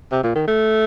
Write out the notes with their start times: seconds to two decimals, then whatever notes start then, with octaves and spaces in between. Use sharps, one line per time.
0.12 C3
0.24 A#2
0.36 D#3
0.48 A3